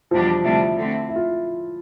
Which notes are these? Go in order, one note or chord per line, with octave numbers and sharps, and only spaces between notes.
E2 B2 F3 G3 D4 G4
D2 C3 G3 D4 E4
D3 A3 C4
E4
F4